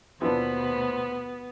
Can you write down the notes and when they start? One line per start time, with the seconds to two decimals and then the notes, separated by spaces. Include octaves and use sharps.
0.22 D#2 B2 E3 F3 B3 D4 C5 B5